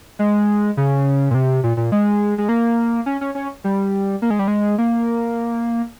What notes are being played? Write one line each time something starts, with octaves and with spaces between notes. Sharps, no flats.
G#3
C#3
A#2
C3
A#2
A#2
G#3
G#3
A#3
C#4
C#4
C#4
G3
A#3
G#3
G3
G#3
A#3